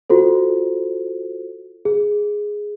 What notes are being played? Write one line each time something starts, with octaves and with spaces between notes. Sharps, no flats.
F4 F#4 A4 C5
G#4